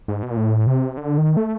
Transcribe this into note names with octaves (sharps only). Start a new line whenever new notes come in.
G#2
B2
A#2
A2
C3
D3
D#3
A3